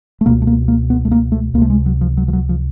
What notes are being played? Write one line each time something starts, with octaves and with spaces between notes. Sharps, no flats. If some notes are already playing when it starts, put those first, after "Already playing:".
A3
C#2 B2 A#3
A3
A#3
A#3
B3
A3
A#3
A3
C#2 C3 A3 A#3
G#3
F#3
F3
F#3
F3
F#3
F3